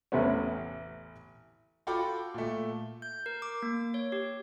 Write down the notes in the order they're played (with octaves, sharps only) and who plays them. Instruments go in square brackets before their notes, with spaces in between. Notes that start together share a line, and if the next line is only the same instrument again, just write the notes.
[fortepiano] A1 E2 C3 A3 B3 C#4
[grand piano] F4 F#4 A4 G5 B5 D6
A#2 A3
[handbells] G6
A#4
D6
A#3
C#5
G4